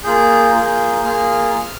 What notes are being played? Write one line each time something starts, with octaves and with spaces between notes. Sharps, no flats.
A#3 F4 G#4 G6
A#3 F4 G#4
A#3 F4 G#4 F6